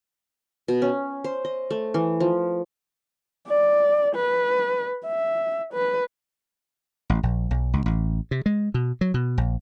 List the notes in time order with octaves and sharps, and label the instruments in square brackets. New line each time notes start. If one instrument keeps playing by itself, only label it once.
[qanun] B2
C#4
C5
D#5
A3
E3
F3
[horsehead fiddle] D5
B4
E5
B4
[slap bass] A1
A#1
B1
C#2
A1
C3
G#3
B2
F#3
B2
A#1